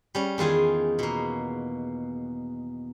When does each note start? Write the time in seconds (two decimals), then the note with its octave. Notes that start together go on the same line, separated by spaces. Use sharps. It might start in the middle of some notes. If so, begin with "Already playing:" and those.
0.15 G3 C#4
0.38 E2 D#3 F4 G#4 G#5
0.99 B2 A#3